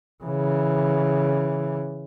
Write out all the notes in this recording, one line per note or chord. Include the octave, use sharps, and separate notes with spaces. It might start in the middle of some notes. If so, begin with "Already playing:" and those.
C#3 E3